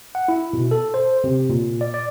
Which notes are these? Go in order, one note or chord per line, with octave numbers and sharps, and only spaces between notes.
F#5
E4
B2
A4
C5
C3
A#2
D5
D5